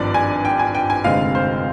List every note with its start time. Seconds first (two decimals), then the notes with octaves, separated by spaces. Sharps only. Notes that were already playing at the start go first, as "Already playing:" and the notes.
Already playing: G#1 G2 F3 D5
0.14 G#5
0.45 G5
0.59 G#5
0.75 G5
0.90 G#5
1.04 F1 D#2 D3 G#3 C4 F5
1.35 C5